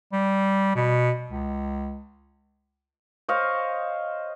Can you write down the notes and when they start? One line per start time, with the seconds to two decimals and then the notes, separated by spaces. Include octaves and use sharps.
0.12 G3
0.75 B2
1.31 C#2
3.29 C5 C#5 D#5 F5